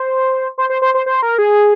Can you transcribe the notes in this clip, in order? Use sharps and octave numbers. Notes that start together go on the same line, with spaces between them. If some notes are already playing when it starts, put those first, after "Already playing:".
Already playing: C5
C5
C5
C5
C5
C5
A#4
G#4